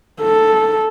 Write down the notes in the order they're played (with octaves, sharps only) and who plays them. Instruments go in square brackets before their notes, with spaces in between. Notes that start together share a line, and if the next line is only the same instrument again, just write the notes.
[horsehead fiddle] A4